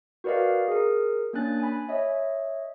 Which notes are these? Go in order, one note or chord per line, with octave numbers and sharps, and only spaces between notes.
F#4 A#4 B4 D5 D#5 F5
G#4 A#4
A#3 C#4 D4 G#5 F#6 A6
G#5 B5
C#5 D#5 E5